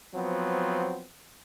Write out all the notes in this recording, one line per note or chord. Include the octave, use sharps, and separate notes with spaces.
F3 F#3 B3 C4